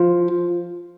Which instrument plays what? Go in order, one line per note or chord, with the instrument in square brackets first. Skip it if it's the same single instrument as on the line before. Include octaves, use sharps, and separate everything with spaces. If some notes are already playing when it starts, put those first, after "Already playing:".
Already playing: [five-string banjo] F3